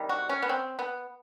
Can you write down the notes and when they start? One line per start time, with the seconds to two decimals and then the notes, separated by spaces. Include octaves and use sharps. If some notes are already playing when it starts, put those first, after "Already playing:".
Already playing: C3 D#3 G3
0.09 F#4
0.29 C#4
0.42 B3
0.49 C4
0.79 B3